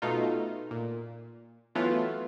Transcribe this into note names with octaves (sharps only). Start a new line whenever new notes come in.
B2 A3 D#4 F4
A#2
E3 F#3 A3 B3 F4